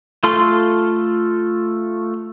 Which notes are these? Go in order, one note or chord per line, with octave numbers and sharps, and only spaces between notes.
A3 F4 A4 C6